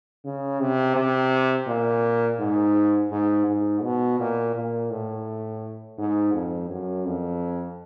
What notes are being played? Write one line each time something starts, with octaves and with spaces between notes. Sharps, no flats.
C#3
C3
C3
A#2
G#2
G#2
G#2
B2
A#2
A#2
A2
G#2
F2
F#2
F2